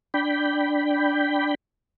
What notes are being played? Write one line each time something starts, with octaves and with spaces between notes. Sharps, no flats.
D4 G5 B5